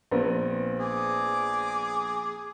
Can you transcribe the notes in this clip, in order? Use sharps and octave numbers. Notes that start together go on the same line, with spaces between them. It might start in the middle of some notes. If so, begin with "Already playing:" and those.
A#1 B3 C4
G#4 D6